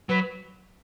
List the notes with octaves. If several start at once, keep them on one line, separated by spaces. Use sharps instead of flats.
F#3 B4